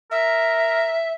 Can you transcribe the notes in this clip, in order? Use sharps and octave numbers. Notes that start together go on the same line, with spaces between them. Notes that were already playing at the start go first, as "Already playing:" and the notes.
A#4 E5